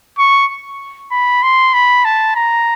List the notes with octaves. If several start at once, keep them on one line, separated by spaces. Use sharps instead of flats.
C#6
B5
C6
B5
A5
A#5